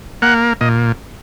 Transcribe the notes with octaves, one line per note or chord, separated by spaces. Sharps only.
A#3 F#5
A#2 D#5